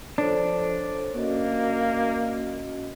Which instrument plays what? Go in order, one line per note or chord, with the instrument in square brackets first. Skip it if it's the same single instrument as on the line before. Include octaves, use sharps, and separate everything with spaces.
[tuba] F3 [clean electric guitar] D4 [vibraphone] A4 C5 C#5
[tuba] A#3 [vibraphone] C#4 F#4 D#5